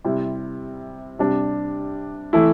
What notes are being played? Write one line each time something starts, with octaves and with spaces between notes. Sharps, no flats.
C3 G3 C4 E4
C3 G3 D4
E3 A3 E4